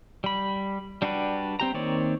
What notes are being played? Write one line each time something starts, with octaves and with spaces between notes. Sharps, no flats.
G3 B5
G3 D4 F#4 G4 B4
C4 G4 A#5
D#3 A#3 C4 C#5 D5